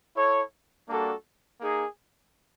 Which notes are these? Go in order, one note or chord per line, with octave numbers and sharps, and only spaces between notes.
E4 A4 C#5
G3 A#3 D4 F#4 A4
A#3 D#4 G#4